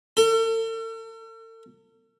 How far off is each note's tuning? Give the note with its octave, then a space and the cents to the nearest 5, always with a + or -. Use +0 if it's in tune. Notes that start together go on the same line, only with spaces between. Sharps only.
A4 +45